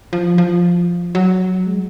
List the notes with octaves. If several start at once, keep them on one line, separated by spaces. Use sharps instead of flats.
F3
F3
F#3
G#3